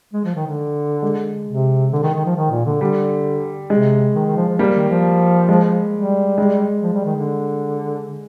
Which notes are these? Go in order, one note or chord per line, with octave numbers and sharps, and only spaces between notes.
G#3
F3
D#3
D3
G#3
C3
D3
D#3
D#3
F3
D#3
A#2
D3
D3 G3
C3 G#3
D#3
D#3
F3
F3
G3 A#3
D#3
F3
G#3
G3
G#3
F3
G3
D#3
D3